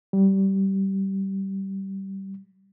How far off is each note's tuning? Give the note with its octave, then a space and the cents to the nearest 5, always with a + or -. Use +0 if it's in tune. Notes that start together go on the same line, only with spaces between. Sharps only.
G3 -20